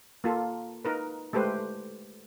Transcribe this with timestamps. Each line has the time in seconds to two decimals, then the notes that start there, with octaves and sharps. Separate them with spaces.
0.24 A#3 F4 A4
0.85 D#4 A#4 B4
1.33 G#3 A3 G4 B4 C5